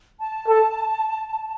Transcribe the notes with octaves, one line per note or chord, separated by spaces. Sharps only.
A5
A4